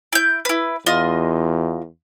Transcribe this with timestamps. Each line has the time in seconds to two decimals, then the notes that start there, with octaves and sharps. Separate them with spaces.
0.13 E4 G6
0.45 E4 B4
0.86 E2 F4 D#5 C6